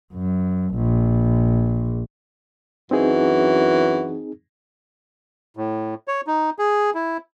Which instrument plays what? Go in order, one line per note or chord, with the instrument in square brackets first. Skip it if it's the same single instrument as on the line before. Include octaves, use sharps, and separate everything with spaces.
[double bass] F#2
A#1
[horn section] F#2 E3 F#4 [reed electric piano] C4 D#4 G#4
[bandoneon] A2
C#5
D#4
G#4
E4